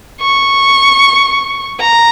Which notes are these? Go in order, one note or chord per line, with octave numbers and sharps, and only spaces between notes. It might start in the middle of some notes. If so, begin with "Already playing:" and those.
C#6
A#5